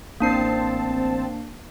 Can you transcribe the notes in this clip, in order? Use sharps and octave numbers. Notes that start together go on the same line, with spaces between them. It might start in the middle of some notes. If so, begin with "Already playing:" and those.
A1 A#3 C4 D4 A5 C7